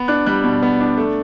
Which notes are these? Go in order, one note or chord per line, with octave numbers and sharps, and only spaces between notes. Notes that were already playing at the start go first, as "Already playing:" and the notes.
Already playing: B3
D4 F#6
G3 F#6
B2
B3
D4
A3